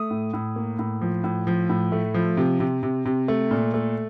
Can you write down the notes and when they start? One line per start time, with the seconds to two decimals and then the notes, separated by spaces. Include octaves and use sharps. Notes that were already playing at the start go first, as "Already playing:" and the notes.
Already playing: A3 D#6
0.10 A2
0.33 A2
0.56 A#3
0.79 A2
1.01 F3
1.24 A2
1.47 F3
1.69 A2
1.92 A3
2.14 F3
2.37 C3
2.60 C3
2.83 C3
3.05 C3
3.28 A3
3.51 A#2
3.74 A3